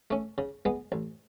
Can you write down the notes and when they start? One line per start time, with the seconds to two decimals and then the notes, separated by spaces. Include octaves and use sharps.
0.11 A3 C#4
0.38 C#3
0.65 G#3 B3
0.92 A1